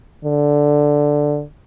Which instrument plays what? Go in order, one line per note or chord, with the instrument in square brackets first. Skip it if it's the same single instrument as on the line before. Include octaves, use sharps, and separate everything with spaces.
[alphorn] D3